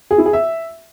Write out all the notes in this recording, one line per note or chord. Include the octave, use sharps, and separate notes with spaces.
G#4
E4
G#4
E5